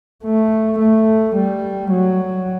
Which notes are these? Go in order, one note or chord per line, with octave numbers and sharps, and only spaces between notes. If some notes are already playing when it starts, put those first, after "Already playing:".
A3
A3
G3
F#3